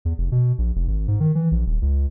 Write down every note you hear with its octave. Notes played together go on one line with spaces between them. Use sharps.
E2
F1
B2
A#1
F1
G#1
G#2
D#3
E3
A#1
D#1
C#2